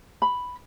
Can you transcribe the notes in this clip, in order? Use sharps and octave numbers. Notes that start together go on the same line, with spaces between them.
B5